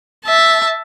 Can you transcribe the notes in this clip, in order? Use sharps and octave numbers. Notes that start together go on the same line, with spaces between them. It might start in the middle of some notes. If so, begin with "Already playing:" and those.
E5 A5